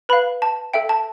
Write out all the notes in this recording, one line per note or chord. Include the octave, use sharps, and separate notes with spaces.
B4 F5 B5
A5
A4 E5 G5
A5